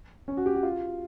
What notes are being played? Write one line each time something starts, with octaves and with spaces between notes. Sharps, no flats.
C#4
F#4
G4
F#4
F4